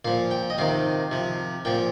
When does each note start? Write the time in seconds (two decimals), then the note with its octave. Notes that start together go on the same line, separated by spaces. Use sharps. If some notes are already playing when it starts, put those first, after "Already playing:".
0.05 A#2 F3 F5
0.31 G5
0.50 D#5
0.58 C3 D#3 F5
1.11 C3 F3
1.65 A#2 F3 G5